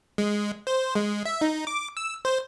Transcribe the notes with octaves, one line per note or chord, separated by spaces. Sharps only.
G#3
C5
G#3
E5
D#4
D6
E6
C5